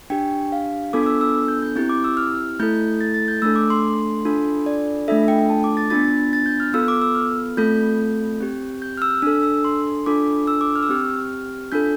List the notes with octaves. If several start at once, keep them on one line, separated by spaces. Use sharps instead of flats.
D4 G4 G5
F5
B3 D4 F4 A4 D6
D6
E6
E6
G6
G6
C4 E4 G4 G6
D6
E6
F6
A3 E4 A4 G6
A6
A6
G6
A3 D4 A4 E6
D6
C6
D4 F4 A4
D5
A3 D4 F4 A4 E5
G5
A5
D6
A6
B3 D4 F4 A6
A6
G6
F6
B3 F4 A4 E6
D6
E6
F6
A3 C4 F4 A4 G6
C4 G4
G6
F6
E6
D4 A4 E6
E6
C6
D4 F4 A4 D6
E6
D6
F6
E6
C4 G4 F6
D4 F4 A4 G6